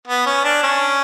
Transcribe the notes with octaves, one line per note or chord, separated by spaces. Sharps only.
B3
C#4
D4
C#4